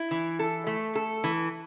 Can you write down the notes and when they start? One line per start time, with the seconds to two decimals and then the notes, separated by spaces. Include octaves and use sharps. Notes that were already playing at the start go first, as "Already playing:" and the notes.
Already playing: E4
0.11 E3
0.39 A4
0.67 A3
0.95 A4
1.24 E3